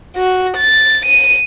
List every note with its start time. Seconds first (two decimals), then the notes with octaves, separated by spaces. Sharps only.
0.16 F#4
0.57 A6
1.06 D#7